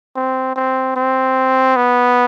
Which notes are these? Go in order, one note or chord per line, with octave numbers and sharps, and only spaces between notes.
C4
C4
C4
B3